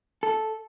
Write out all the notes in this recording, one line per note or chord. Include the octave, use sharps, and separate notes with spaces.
A4